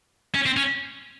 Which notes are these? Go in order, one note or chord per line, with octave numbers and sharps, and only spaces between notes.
C#4
C4
C#4